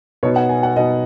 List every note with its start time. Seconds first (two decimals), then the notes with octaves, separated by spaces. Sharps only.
0.23 B2 B3 D#4 C#5
0.36 F#5
0.49 G#5
0.63 F#5
0.76 B2 B3 D#4 D#5